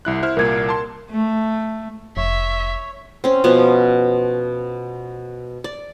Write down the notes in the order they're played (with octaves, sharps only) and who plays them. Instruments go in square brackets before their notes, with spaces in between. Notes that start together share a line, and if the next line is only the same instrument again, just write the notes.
[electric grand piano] C2 E4 F#6
E4 C5 F6
[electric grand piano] C2 A#2 A#3 [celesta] A#4 G#6
[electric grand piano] A5 C6
[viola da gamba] A3
[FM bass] F1 [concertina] C#5 [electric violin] E5
[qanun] C4 C#4
B2 F3 B3 C#4
D5